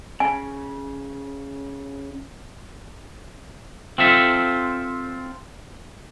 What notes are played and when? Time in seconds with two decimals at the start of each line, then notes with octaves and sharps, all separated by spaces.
0.20 C#3 G#5
3.98 C4 F4 A4 E5